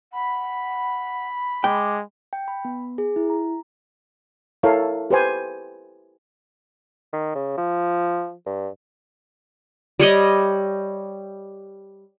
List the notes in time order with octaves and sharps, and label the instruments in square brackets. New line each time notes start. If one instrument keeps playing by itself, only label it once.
[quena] F#5 [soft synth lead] B5
[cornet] G#3 [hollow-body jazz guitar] G5 [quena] D6
[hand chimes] G5
B5
B3
G#4
E4
A#5
[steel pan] E4 A4 A#4 C#5 F5
G4 B4 C5 G#5
[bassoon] D#3
C#3
F3
G2
[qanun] G3 C#5 D#5